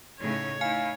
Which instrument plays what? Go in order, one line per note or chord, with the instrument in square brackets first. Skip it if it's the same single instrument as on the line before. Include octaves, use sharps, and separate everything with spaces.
[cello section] A2 C#3 D#4 [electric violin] C#5
[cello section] D#4 E4 [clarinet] F5 [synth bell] G#5